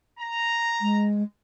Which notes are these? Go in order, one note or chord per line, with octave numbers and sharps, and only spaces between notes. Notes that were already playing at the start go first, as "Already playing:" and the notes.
A#5
G#3